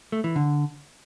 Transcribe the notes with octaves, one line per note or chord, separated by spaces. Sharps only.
A3
E3
D3